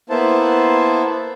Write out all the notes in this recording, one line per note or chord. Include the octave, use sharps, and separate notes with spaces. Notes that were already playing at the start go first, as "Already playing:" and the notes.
A#3 B3 E4 C5 A5